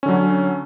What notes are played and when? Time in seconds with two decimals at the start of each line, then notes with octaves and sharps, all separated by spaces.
0.03 C#4
0.06 D3
0.09 F#3